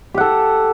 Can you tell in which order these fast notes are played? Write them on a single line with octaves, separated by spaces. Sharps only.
G4 F#5 A4